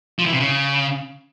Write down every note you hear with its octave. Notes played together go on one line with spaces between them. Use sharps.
F3
E3
C3
C#3